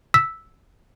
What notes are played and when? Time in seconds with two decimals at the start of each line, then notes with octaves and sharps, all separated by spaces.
0.14 E6 B6